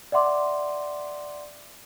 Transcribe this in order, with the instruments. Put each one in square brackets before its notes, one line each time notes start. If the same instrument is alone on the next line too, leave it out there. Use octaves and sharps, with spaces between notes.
[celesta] D5 E5 F#5 C6 D6